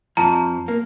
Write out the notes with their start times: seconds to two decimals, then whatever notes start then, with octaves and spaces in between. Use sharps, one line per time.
0.17 F2 F3 A5 A#5
0.68 A#3